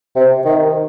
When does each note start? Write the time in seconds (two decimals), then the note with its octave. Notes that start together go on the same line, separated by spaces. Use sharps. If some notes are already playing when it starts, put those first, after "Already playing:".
0.15 C3
0.45 D#3